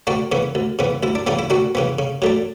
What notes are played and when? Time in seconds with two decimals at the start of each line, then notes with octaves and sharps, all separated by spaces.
0.07 D2 D4 F#4
0.32 C#3 E3 B3
0.55 D2
0.79 C#3 E3 B3
1.03 D2 E4
1.15 D4
1.27 C#3 E3 B3 D4
1.39 E4
1.50 D2 D4 F#4
1.75 C#3 E3 B3
1.99 C#3
2.22 F#3 A3 D4